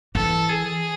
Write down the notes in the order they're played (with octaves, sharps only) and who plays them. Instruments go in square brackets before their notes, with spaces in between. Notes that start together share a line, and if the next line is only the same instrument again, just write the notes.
[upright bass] E3 [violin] A4
[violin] G#4